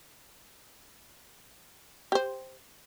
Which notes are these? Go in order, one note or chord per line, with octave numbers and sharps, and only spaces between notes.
G4 C5